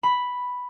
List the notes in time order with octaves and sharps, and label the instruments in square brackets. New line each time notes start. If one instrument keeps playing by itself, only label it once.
[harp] B5